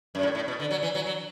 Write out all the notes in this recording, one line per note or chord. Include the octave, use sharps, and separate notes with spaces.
F#2
A2
A2
B2
D3
F#3
E3
F#3
F#3